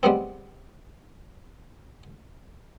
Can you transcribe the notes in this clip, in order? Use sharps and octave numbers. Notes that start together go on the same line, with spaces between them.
G3 G#3 B3 C4